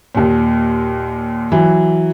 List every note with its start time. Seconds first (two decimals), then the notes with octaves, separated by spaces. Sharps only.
0.15 D#2 A#2
1.52 E3 F#3